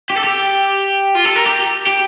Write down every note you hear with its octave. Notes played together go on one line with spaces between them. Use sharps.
G4
A4
G4
F4
A4
A#4
G4
G4